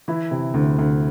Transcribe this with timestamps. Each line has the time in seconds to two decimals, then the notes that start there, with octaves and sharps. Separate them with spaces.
0.08 E3 E4
0.31 C3
0.54 D2
0.78 D2